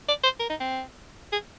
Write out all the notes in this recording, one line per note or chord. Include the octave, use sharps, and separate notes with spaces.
D5
C5
A#4
D#4
C4
G#4